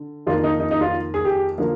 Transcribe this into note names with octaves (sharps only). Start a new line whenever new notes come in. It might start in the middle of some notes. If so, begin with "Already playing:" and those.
Already playing: D3
F2 D#3 A#3 F4
D#4
D#4
D#4
F4
G#4
G4
D3 F3 A#3